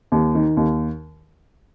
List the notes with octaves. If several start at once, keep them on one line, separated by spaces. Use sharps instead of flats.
D#2
D#3
D#2